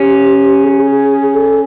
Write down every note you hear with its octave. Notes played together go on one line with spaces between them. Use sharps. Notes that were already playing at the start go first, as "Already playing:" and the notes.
Already playing: C#4 G4
G#4
G4
G#4
A4